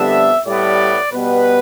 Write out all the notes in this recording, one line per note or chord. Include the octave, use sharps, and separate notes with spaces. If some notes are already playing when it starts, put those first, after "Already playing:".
Already playing: F2 D3 G3 B3 D4 E5
A2 G3 B3 D5
B2 G3 B3 B4